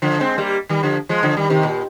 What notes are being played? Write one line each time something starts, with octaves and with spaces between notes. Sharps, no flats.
D3 F3
G#3 C4
G3 A#3
D#3 G3
D3 F3
F3 G#3
D3 F3
D#3 G3
C3 D#3
A#2